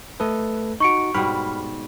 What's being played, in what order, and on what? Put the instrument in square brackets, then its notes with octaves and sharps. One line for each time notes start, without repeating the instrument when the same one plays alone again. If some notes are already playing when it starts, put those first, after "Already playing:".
[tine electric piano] A3 A4 B4 [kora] D#5
[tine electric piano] D#4 F#4 [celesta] C#6 C#7 D7
[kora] G#2 B2 G3 [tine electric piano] B5 F6